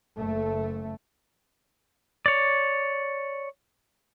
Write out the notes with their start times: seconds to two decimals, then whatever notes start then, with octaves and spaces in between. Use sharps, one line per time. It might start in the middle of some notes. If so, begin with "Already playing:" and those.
0.18 F#1 A3
2.26 C#5 D5